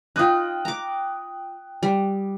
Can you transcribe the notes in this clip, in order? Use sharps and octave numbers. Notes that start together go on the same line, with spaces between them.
D#4 F4 G5 D#6 F#6
A#5 D6
G3